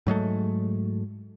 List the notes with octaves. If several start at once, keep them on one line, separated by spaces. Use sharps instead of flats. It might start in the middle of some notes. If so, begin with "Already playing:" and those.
G#2 F#3 G#3 A3